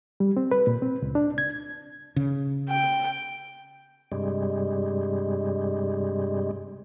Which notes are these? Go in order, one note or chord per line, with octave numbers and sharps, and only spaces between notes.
G3
C4
B4
A#2
C4
C#2
D4
G#6
C#3
G5
G2 C3 G3 G#3